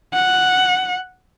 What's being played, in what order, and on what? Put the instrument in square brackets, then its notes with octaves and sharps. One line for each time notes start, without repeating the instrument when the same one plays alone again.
[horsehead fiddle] F#5